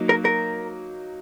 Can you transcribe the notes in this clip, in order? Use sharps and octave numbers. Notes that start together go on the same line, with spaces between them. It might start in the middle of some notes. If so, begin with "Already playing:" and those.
Already playing: F#3 A#3 D#4
A#4
A#4